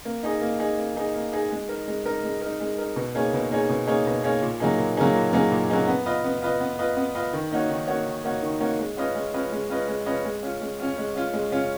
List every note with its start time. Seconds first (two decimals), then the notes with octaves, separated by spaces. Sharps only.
0.05 A#3
0.23 D#4 G#4 D#5
0.41 A#3
0.59 D#4 G#4 D#5
0.78 A#3
0.96 D#4 G#4 D#5
1.15 A#3
1.32 D#4 G#4 D#5
1.51 G#3
1.69 D#4 A#4
1.88 G#3
2.06 D#4 A#4
2.24 G#3
2.42 D#4 A#4
2.60 G#3
2.78 D#4 A#4
2.96 B2
3.15 A#3 D#4 G#4 C#5
3.33 B2
3.51 A#3 D#4 G#4 C#5
3.69 B2
3.87 A#3 D#4 G#4 C#5
4.06 B2
4.24 A#3 D#4 G#4 C#5
4.42 A#2
4.60 F#3 A#3 D#4 G#4
4.78 A#2
4.97 F#3 A#3 D#4 G#4
5.15 A#2
5.33 F#3 A#3 D#4 G#4
5.52 A#2
5.70 F#3 A#3 D#4 G#4
5.88 B3
6.06 F4 B4 D#5
6.24 B3
6.42 F4 B4 D#5
6.60 B3
6.79 F4 B4 D#5
6.97 B3
7.15 F4 B4 D#5
7.33 D#3
7.52 A#3 D#4 F#4 C#5
7.70 D#3
7.88 A#3 D#4 F#4 C#5
8.06 D#3
8.24 A#3 D#4 F#4 C#5
8.43 D#3
8.60 A#3 D#4 F#4 C#5
8.79 G#3
8.97 C#4 F4 B4 D#5
9.15 G#3
9.34 C#4 F4 B4 D#5
9.52 G#3
9.70 C#4 F4 B4 D#5
9.88 G#3
10.06 C#4 F4 B4 D#5
10.25 G#3
10.43 C#4 F4
10.61 G#3
10.80 C#4 F4
10.98 G#3
11.16 C#4 F4
11.34 G#3
11.52 C#4 F4